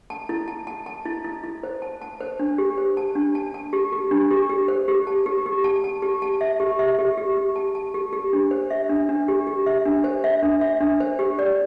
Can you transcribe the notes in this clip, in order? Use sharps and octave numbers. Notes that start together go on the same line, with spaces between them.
A5
E4
A5
A5
A5
E4
E4
E4
C5
A5
A5
C5
D4
G4
C5
A5
D4
A5
A5
G4
G4
D4
G4
G4
C5
G4
A5
G4
G4
A5
A5
G4
A5
E5
G4
E5
G4
G4
G4
A5
A5
G4
G4
D4
C5
E5
D4
D4
G4
G4
E5
D4
C5
E5
D4
E5
D4
C5
G4
D5